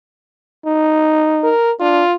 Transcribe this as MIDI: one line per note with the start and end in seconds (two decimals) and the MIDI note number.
0.66 1.52 63
1.43 1.72 70
1.80 2.03 62
1.80 2.16 65